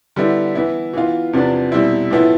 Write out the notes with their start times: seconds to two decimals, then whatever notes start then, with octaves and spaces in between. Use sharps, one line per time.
0.16 D3 G3 B3 E4
0.55 E3 B3 E4
0.94 E3 B3 F4
1.33 E2 C3 F3 B3 D4
1.72 B2 G3 C4 E4
2.11 A2 F3 B3 E4